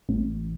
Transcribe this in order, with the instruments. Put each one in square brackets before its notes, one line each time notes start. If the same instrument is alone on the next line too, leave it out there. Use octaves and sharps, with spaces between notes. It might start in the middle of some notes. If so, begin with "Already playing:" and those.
[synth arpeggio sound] A1